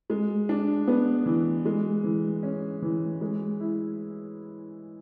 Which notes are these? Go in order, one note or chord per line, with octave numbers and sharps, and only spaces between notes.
G#3
D4
B3
E3
G#3
E3
C#4
E3
G#3
E4